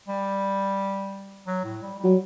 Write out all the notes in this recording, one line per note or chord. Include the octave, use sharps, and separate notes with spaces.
G3
F#3
A2
G3
G3
F#3